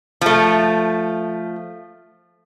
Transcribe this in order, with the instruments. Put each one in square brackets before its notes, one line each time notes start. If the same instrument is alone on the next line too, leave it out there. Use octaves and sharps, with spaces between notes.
[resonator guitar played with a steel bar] F3 A3